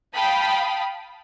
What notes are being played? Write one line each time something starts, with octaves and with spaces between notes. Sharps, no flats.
F5 G5 A5 B5 D#6